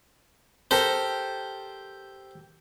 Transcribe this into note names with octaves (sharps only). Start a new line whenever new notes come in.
G4 A4 A#4 C5